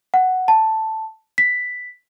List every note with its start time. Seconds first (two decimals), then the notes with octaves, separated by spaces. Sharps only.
0.14 F#5
0.48 A5
1.38 B6